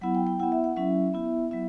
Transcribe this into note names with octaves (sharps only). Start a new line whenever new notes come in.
F#3 B3 E4 F#5
G5
G5
B3 E4 F#5
E5
F#5
F#3 C#4 E4 E5
B3 E4
F#3 B3 E4 E5